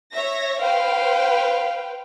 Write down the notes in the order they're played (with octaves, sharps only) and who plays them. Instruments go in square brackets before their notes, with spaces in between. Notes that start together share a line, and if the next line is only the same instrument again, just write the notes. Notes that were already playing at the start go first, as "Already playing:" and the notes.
[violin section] C#5 E5 A#6
[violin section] B4 C5 G5 [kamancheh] F5